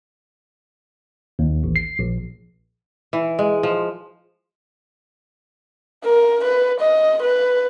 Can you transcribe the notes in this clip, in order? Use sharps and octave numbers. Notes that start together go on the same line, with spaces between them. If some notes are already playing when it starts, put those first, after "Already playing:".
D#2
A1
C7
A#1
E3
G#3
F3
A#4
B4
D#5
B4